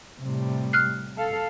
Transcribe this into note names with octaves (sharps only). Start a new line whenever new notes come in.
A2 C3 G3
F6 F#6 C7
A4 F5